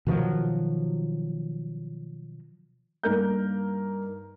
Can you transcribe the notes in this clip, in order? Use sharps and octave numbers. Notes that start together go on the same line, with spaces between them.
B2 D#3 F3 F#3
G2 A#3 D#4 A#4 G6